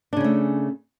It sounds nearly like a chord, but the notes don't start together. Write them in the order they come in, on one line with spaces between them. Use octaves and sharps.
D4 C#3 C#4 A3